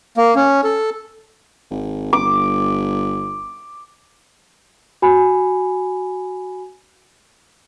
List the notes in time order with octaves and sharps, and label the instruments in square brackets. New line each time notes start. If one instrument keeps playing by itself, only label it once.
[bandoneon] A#3
C#4
A4
[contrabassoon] G#1
[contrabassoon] G1 [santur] D6
[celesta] F#4 G#5 B5